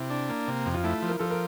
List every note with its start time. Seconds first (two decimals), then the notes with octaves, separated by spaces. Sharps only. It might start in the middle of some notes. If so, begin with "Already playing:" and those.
Already playing: C3 E4
0.10 D4
0.29 A#3
0.48 C3
0.66 F2
0.74 F4
0.84 A3 E4
1.02 F3
1.08 A#4
1.19 F3 A4
1.31 A#4